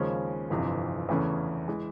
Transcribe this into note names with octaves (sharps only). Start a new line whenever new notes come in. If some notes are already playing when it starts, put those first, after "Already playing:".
Already playing: D#2 C#3 F3 G#3 C#4
G1 F2 C3 E3
E2 C#3 E3 A3 C#4
E3 G#3